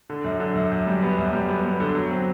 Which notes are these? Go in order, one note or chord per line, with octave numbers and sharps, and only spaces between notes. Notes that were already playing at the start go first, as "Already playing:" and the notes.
D3
F#2
D3
F#2
F#2
G3
B3
F#2
G3
B3
B3
D3
F#3
C4